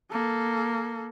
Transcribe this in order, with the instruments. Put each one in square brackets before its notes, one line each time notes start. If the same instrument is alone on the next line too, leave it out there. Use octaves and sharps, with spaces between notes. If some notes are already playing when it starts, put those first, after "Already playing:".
[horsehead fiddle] A#3 A4